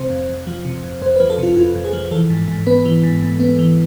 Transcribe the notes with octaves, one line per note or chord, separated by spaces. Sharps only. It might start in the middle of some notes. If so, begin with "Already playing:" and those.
Already playing: C3 C5
F2
F2
F3
C3
F2
F2 C5
F3 B4
A4
C3 F4
F2 F4
F2
G#4
F3
E3 A4
G#2
G#2
B3 B4
E3
G#2
G#2
B3
E3